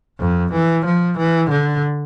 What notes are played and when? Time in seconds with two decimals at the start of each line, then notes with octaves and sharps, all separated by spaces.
0.20 F2
0.53 E3
0.86 F3
1.18 E3
1.50 D3